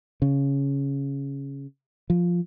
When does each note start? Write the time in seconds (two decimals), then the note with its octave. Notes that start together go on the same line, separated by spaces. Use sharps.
0.22 C#3
2.10 F3